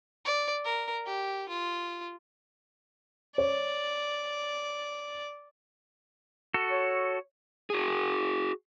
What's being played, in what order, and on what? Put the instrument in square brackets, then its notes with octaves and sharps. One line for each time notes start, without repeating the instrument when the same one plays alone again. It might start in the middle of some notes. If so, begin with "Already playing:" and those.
[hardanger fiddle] D5
A#4
G4
F4
[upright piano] C#5 [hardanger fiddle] D5
[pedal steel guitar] F#4 A4
[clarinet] C#5
[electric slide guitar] F#4 G#4